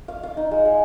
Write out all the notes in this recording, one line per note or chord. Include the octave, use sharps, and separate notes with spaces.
F5
F5
D#4
G#3
G#3